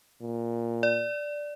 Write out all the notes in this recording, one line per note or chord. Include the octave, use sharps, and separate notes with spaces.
A#2
D5